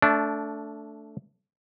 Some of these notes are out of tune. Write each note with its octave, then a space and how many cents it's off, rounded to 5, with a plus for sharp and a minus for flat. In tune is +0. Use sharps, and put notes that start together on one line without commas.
A3 +0 D4 -20